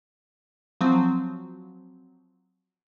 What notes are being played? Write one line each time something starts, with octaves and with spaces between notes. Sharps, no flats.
F3 F#3 C4